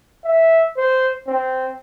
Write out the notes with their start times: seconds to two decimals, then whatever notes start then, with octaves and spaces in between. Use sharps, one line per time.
0.25 E5
0.77 C5
1.28 C4